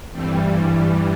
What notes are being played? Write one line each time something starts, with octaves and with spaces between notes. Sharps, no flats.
G2 E3 G3 A3 C4